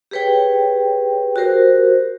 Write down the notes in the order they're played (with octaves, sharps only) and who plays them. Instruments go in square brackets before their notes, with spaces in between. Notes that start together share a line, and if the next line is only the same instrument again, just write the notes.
[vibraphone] G4 G#4 B4 C#5 G5
F#4 G4 A#4 C5